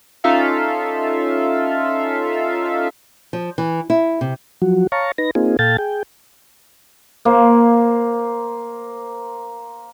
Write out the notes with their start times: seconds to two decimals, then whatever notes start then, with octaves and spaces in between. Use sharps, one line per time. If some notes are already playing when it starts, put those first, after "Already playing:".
0.24 C#4 D#4 F4 A4 E5 F5
3.33 F3
3.58 E3
3.90 E4
4.21 C3
4.62 F3 F#3 F#4
4.92 C#5 F5 A5 A#5 C#6
5.18 D#4 B4 A#6
5.35 A#3 C4 D#4 F4 G#4
5.59 A#2 A4 F5 G5 A5 A6
5.78 G#4 G5
7.25 A#3 C5